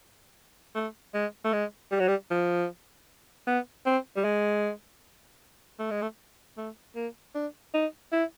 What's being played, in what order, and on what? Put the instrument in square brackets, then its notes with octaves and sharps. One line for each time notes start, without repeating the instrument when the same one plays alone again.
[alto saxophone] A3
G#3
A3
G#3
G3
F#3
G3
F3
B3
C4
G3
G#3
A3
G#3
A3
A3
A#3
D4
D#4
E4